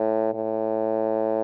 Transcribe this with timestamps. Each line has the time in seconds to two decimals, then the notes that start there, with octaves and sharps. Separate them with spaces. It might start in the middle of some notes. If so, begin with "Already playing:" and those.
Already playing: A2
0.34 A2